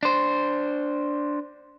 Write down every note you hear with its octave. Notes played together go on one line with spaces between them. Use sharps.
D4 C5